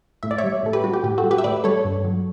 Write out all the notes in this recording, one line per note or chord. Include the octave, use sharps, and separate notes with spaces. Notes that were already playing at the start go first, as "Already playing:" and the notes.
A2 E5
D5
C#5 E5
G3
A2 A4
G4 B4
G3 F#4
G4
A2 G4
F#4 A4
G3
G4 B4
E5
A2 B4 D5
G3 A4 C#5
G2
F#3